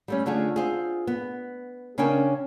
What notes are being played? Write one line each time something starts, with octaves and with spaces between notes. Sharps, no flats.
G3 A3 C#4
D3 A3 D4 F4 G#4
C4 F4 G#4
B3
C#3 C#4 D4 A#4 G5 G#5